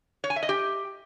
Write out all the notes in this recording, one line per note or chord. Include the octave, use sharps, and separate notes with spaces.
C#5
G#5
E5
D#5
G4